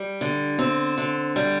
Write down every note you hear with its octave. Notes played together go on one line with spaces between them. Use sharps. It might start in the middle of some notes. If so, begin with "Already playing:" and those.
Already playing: G3
D3
C4
D3
G3